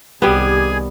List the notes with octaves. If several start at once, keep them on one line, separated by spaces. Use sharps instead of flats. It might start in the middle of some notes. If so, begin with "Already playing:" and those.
C2 D#3 G3 B3 G4 G#4 G#5